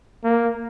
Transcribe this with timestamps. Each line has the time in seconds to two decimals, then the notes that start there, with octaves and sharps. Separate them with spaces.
0.24 A#3